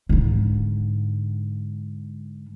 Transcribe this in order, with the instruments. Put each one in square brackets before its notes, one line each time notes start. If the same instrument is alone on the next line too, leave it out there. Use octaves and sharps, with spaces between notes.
[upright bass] G#2 D3